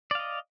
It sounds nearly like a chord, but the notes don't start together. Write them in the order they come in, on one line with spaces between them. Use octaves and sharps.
D5 F5 D#5